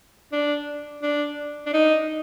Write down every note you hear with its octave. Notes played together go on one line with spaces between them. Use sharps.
D4
D4
D4
D#4